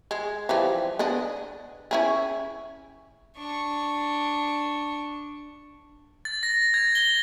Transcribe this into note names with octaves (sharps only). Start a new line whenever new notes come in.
G#3
E3 F3 G3
B3 D4 D#5
C#4 E4 G#4
D4 C#6
A6
A#6
G#6
G7